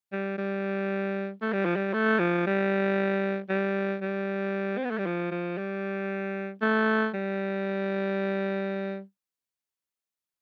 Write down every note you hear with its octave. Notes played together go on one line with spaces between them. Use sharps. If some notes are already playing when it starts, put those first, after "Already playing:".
G3
G3
A3
G3
F3
G3
A3
F3
G3
G3
G3
C4
B3
A3
G3
F3
F3
G3
A3
G3